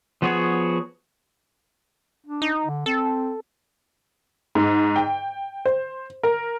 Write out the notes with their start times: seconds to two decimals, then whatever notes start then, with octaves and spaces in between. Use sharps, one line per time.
0.22 F3 B3 F#4 G#4 C#5
2.26 D4
2.42 D#4
2.66 D3
2.86 C4 A4
4.55 G#2
4.96 G5
5.65 C5
6.23 A#4